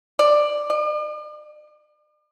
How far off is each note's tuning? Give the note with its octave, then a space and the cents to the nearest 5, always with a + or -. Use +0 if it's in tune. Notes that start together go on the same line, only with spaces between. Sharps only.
D5 +10
D5 +45